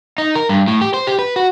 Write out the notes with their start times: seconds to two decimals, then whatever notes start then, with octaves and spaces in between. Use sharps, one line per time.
0.18 D#4
0.35 A#4
0.49 G2
0.68 A2
0.81 G4
0.94 C5
1.07 G4
1.19 B4
1.36 F#4